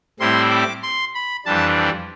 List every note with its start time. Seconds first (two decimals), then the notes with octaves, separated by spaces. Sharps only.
0.20 A2 G3 C4 E4 C6
0.51 D6
0.83 C6
1.14 B5
1.46 F2 E3 G3 D4 A5